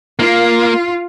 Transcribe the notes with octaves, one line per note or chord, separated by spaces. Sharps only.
A#3 F4